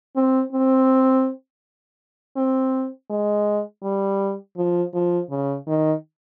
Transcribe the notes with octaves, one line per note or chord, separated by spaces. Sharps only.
C4
C4
C4
G#3
G3
F3
F3
C#3
D#3